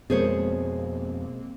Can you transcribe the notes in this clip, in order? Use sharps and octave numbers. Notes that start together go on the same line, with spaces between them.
F2 B2 G#3 A#3 C4 G#4 C5 C#5